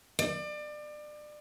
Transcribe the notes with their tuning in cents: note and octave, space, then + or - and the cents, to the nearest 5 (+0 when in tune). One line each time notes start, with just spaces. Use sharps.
D5 +30